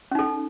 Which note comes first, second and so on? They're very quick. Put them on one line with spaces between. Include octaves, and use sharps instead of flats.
C#4 D#4 A4